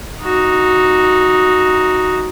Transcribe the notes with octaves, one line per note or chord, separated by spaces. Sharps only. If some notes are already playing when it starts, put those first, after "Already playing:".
D#4 F#4